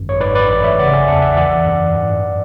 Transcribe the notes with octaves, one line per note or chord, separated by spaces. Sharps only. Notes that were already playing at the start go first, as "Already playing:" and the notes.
Already playing: G#1 F#2
C#5
G#2 B4 D5
B4 D5
A1
C#5 E5
C#3 D5 F#5
E5 G#5
E2 F#5 A5
E5 G#5
E3 D5 F#5
F#2
G#2